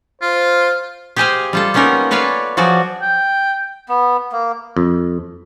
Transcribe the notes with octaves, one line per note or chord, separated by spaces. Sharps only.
F4 C5
G4 G#4 C5 D#5 F5 G#5
G3 F4 A4
A#3 B3 C#4 D#4 A#4
A4 B4 C#5 D5 F5 G#5
F3 F#3 F#4 G#4 D5
G5
B3
A#3
F2